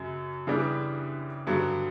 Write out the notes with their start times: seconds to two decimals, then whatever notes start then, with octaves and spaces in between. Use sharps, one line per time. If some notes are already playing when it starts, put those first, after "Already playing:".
Already playing: F#2 C#3 F#3
0.47 C#3 E3 G3 B3 D4
1.47 G2 D3 F#3 B3 D4